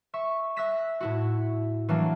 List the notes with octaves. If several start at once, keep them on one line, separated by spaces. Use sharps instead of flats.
E5 C#6
E5 E6 F#6 A#6 B6 E7
A2 E4 F#4
E3 F#3 A#3 D4